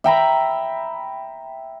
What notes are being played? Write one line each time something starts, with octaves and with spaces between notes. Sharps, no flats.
E5 G5 A#5 B5